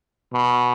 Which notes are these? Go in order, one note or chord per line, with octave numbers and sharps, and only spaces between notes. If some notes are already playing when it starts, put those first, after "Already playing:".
B2